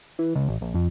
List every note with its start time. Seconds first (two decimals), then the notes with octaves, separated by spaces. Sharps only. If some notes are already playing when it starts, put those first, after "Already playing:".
0.19 E3
0.35 C#2
0.48 A1
0.61 A#1
0.74 F2